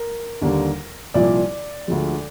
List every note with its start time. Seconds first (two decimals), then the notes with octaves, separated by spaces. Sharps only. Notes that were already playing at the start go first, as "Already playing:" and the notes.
Already playing: A#4
0.42 D#2 D3 G3 A#3
1.14 C2 A#2 F3 D5
1.88 D2 D3 F3 G#3